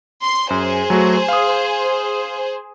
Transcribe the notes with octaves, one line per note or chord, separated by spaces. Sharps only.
C6
F#2 G#4 C5
F#3 A3 F#4
F5 D#6